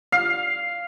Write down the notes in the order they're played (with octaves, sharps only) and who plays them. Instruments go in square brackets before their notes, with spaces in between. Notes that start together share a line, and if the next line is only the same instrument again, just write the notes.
[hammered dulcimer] F5